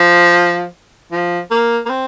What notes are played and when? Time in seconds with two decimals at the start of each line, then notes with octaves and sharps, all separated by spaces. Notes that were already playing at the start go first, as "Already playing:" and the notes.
Already playing: F3
1.12 F3
1.51 A#3
1.86 A#3
1.90 C4